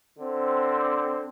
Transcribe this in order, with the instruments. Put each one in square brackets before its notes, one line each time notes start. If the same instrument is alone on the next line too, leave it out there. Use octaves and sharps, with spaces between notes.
[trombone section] D3 C4